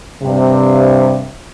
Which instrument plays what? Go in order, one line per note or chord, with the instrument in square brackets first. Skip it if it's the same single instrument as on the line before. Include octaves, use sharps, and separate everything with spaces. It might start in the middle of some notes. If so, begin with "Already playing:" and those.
[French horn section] G2 C3